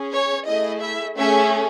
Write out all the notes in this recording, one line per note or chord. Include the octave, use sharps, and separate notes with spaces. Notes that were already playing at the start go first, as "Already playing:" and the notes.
Already playing: C#4 G#4
C#5
A3 E4 G#4 D#5
E5
A3 C#4 G#4 E5